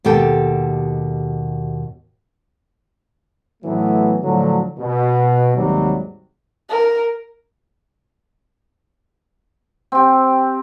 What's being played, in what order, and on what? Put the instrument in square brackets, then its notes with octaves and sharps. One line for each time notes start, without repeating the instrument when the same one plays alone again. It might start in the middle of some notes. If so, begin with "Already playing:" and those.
[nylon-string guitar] D#2 B2 G4 A4 G5
[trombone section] A2 E3 F#3 A3 B3
A2 D3 F3 F#3
B2
D#2 G#2 C3 F#3 G3
[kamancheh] A#4
[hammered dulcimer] C4 G4